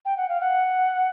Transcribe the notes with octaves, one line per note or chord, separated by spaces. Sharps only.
G5
F#5
F5
F#5